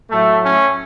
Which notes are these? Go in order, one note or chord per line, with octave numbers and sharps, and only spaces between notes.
A2 F#3 A3
C#4